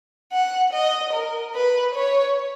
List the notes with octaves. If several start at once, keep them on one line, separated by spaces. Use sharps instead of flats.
F#5
D#5
A#4
B4
C#5